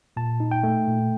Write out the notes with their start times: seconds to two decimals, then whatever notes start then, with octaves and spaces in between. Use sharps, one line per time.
0.17 A#2 A5
0.40 D#4
0.51 G5
0.63 A3
0.87 A#2